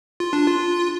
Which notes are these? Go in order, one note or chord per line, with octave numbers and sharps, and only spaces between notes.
F4
D4
F4